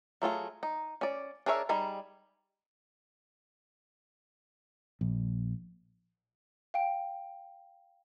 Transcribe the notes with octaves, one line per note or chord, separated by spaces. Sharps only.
F#3 A3 F4 G#4
D#4
C#4 D5
D4 G#4 A#4 C#5 E5
G3 D#4 G#4 B5
A#1
F5 G5 D7